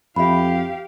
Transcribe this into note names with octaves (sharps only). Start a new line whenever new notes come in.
F2 G4 E5 F5 B5